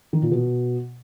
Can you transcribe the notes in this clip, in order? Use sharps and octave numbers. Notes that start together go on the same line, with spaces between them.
D#3
A#2
B2